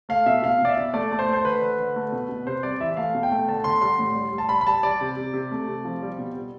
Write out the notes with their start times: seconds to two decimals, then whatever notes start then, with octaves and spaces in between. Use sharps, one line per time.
0.09 A3 F5
0.26 B2 E5
0.43 B2 F5
0.61 B2 D5
0.69 E5
0.77 B2
0.94 A3 D5
1.11 A3
1.19 C5
1.27 A3
1.33 C5
1.45 D3 B4
1.61 D3
1.79 D3
1.96 A3
2.12 B2
2.29 B2
2.47 C3 C5
2.63 G3 D5
2.80 E3 E5
2.97 A3 F5
3.14 B2
3.23 G5
3.32 A3
3.48 D3 A5
3.64 D3 C6
3.82 G3 C6
3.99 A2
4.15 G3
4.32 G3
4.38 A5
4.49 G3 B5
4.61 B5
4.67 G3 A5
4.83 G3 D5
5.01 C3
5.17 C3
5.33 C3
5.52 A3
5.68 C3
5.85 F3
6.02 G3
6.19 B2
6.35 G3